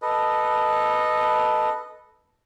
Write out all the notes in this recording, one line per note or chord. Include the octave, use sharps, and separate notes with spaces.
A4 B4 D#5